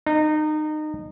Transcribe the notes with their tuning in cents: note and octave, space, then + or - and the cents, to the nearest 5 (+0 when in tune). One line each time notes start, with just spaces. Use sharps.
D#4 -25